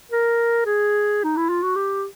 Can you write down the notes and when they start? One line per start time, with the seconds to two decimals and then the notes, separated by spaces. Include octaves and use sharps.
0.12 A#4
0.66 G#4
1.24 D#4
1.37 E4
1.49 F4
1.63 F#4
1.76 G4